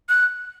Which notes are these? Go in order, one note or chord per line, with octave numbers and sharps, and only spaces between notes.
F#6